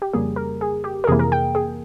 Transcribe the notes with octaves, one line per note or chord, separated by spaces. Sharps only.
G4
F2 C#3 G3 A#3 G#4
A#4
G#4
G4
A#4
F2 C3 E3 A#3 G#4
A#4
G5
G#4